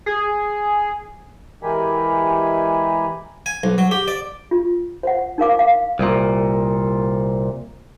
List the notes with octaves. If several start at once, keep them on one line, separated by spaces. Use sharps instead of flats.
G#4
E3 G#3 G4 A#4 G#5 B5
G#5
B1
F#3
G4
D5
F4
C5 F#5
D#4 A#4 F5 D6
F5
C2 A#2